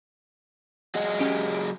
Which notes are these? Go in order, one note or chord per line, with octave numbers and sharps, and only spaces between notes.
F#3 G#4 D#5 F#5
C#4 G4 D7